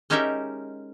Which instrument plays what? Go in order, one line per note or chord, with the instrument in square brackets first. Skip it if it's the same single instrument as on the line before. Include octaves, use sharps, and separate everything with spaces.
[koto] G#3 C#4 D#4 G4 A#4 E5